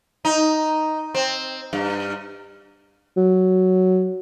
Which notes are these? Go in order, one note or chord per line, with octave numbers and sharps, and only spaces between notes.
D#4
C4
G2
F#3